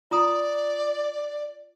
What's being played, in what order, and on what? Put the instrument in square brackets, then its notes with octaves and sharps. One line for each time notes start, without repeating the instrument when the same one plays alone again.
[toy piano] F4 A#5 D#6 [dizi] D5